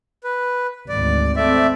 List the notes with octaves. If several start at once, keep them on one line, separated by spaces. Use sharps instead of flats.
B4
G#1 D2 D5
A3 C4 D5 E5